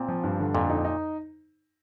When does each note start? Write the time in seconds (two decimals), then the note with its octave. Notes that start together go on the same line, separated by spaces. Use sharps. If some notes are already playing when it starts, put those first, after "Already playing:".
Already playing: A#2 C4
0.08 F3
0.24 G2
0.39 D3
0.54 F2 A#2
0.70 D#4
0.85 D#4